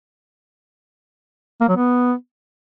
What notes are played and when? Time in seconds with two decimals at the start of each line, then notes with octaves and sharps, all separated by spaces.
1.61 A#3
1.69 F#3
1.77 B3